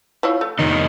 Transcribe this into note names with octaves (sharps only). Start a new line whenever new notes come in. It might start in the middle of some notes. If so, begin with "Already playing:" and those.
F3 E4 C#5
A3
F2 D#3 D#4